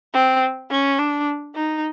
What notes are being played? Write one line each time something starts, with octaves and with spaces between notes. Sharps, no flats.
C4
C#4
D4
D#4